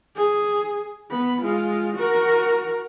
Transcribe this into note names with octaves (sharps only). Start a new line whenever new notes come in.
G#4
B3 B5
G#3 F4
F#4 A#4